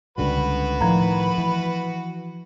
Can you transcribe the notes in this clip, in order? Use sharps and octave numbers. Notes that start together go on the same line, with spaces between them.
C#2 D3 G3 F#4 B4 B5
A2 D#3 F3 A#5
E3